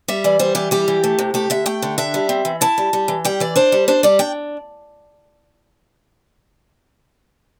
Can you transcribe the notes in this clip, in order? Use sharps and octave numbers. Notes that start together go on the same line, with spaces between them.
G3 E5
E3 D5
G3 C5
E3 G4
G3 G4
E3
A3
C3
A3 G4
D3 E5
A3 G5
D3
D4 E5
G3
C4
E3
E4 A5
G3
G3
E3
G3 G5
E3 D5
D4 C5
G3
D4 C5
G3 D5
D4 G5